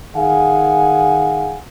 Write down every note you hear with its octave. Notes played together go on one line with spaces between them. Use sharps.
D#3 G#4 F5 F#5 G#5